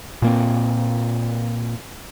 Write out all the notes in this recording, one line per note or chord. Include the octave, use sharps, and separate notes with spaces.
A#2 A#3 C4